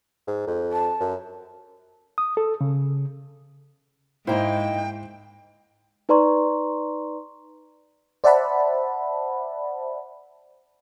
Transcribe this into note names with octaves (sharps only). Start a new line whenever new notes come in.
G#2
F2
A5
F#2
D#6
A4
C#3
G#2 A#3 D#4 E4 C5 G5
D#4 B4 D5 A#5 C6 C#6
C5 D5 E5 F#5 A5 B5